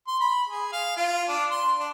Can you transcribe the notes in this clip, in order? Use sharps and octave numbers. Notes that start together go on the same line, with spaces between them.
C6
B5
G#4
F5
F4
D4
C6
D4